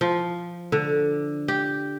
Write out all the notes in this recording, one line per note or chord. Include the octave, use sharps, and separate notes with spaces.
F3
D3
G4